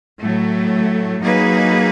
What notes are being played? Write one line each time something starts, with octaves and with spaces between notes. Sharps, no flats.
A2 F#3 A3
F#3 A#3 D#4 G#4 B4